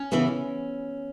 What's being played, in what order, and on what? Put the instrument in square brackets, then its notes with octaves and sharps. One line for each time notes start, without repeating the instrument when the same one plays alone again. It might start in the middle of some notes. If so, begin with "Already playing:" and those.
Already playing: [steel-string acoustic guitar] C#4
C#3 E3 B3